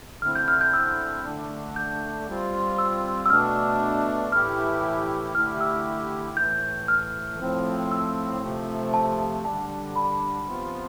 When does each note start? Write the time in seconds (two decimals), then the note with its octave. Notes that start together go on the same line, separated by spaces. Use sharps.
0.22 D3 A3 C4 E4 F6
0.35 G6
0.48 F6
0.61 G6
0.74 E6
1.24 D3 A3 D4
1.76 G6
2.28 G3 C4 F4
2.78 E6
3.26 E6
3.30 B2 A3 D4 F6
4.32 A2 E3 A3 E4 G4 F6
5.35 D3 A3 E4 G4 F6
5.61 E6
6.37 A2 E3 A3 G6
6.88 F6
7.39 A2 F3 C4
7.92 E6
8.42 C3 F3 A3
8.94 A5
9.44 D3 G3 D4 A5
9.96 B5
10.47 C3 F3 B3 F4